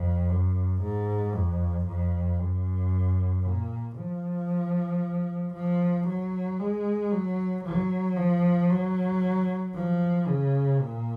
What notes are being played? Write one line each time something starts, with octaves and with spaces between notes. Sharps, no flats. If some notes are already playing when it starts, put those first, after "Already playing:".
Already playing: F2
F#2
G#2
F2
F2
F#2
A#2
F3
F3
F#3
G#3
F#3
F#3
F3
F#3
F3
C#3
A#2